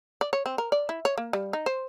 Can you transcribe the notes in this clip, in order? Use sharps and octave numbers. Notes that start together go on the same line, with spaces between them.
D5
C#5
C4
A#4
D5
E4
C#5
A#3
G3
D#4
C5